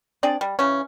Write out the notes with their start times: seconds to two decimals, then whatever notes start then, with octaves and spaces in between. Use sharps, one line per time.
0.23 C4 D4 G#4 D5
0.41 G3
0.59 C#3 E3 C#4